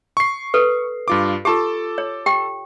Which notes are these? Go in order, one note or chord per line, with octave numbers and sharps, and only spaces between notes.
C#6 C7
A4 B4
G2 F4 D6
F4 G4 A4 A5 D6
C#5
G4 G5